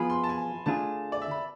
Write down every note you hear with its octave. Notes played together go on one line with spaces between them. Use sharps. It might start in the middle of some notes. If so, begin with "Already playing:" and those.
Already playing: F3 B3 F4 G#4 B5
C6
A5
G#5
D3 A3 D4 F4 G#4 A5
D5
E5
B5